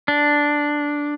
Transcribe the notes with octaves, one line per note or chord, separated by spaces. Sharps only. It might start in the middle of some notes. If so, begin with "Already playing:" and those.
D4